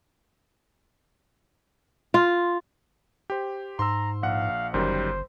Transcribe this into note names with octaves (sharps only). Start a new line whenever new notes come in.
F4
G4 C5
G#2 A#5 C6 E6
A#1 F5 F#5
G1 F#2 D#3 G3 C5